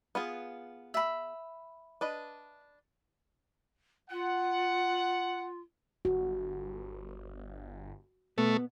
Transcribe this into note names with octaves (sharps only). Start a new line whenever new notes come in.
B3 F4 G#4
E5 B5
D4 B4 D#5
F4 F#5
G1 F#4
B2 A3 B3